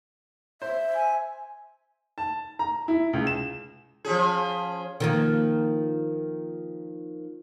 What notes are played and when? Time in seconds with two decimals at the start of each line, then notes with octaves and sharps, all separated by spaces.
0.62 C5 E5
0.95 G#5
2.18 A5
2.59 A#5
2.88 E4
3.13 C#2
3.27 E7
4.05 F3 C#4 G#4
5.00 D#3 F3 A#3